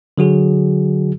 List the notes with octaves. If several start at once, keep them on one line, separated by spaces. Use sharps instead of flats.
D3 F#3 F#4 G#4